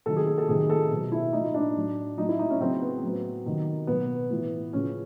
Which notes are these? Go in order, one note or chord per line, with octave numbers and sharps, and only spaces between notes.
C3 D#3 F#3 A4
G#4
G#4
A4
C3 D#3 F#3 G#4
A4
B2 F#3
E4
A2 F3 D#4
D4
A2 F#3
A2 F#3 D#4
E4
D#4
C#4
C#3 F#3 C4
B3
A2 F#3
C3 D#3 F#3
B2 F#3 B3
A2 E3
C#3 F3 C#4